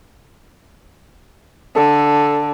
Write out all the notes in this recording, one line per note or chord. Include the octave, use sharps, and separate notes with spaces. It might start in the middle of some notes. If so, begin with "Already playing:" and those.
D3 A4